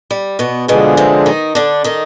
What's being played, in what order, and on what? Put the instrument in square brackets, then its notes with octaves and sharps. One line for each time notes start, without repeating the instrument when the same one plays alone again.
[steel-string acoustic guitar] G3
B2 B3
[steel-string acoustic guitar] B2 B3 [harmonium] D3 F3 G#3 D4 G#4
[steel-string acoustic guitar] C3 C4
D#3 D#4
D3 D4
D#3 D#4